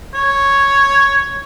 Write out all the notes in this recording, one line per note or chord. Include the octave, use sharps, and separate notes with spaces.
C#5